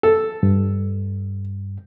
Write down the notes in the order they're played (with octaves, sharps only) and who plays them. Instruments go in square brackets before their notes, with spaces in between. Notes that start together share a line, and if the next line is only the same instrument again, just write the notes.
[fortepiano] A4
[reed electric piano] G2